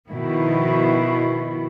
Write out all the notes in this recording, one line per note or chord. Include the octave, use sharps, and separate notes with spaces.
B2 D#3 F3 E4